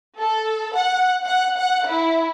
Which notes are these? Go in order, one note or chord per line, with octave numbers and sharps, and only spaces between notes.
A4
F#5
F#5
F#5
E4